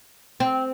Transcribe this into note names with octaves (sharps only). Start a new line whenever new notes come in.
C4